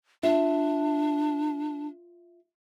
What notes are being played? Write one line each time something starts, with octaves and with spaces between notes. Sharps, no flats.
D4 F4 E5